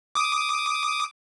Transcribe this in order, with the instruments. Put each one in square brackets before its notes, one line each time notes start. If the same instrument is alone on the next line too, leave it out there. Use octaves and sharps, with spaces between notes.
[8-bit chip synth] D6 D#6